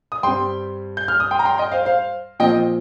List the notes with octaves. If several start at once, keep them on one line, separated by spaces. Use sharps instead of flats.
D#6
G2 G3 C4 G5 C6
G6
F6
D#6
G5 C6
A#5
G5 C6
D#5 G5
C5 F5
C5 F5
A#2 F3 C4 D#5 G5